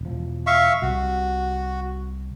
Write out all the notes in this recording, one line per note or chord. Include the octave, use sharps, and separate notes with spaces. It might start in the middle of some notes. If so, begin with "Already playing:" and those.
E1 F3
E5 F5 C#6
C2 C3 F#4